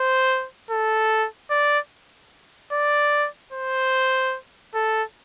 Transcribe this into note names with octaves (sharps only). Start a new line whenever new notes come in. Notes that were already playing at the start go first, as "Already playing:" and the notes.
Already playing: C5
A4
D5
D5
C5
A4